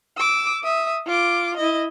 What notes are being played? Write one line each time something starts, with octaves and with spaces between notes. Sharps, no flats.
D6 E6
E5 D#6
F4 D6
E4 D#5